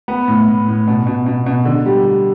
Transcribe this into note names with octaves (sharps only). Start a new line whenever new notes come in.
B3
A2
A2
A2
B2
B2
B2
B2
D3
G3
G3